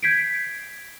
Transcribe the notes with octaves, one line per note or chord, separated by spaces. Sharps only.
G6 G#6 B6 C7 D7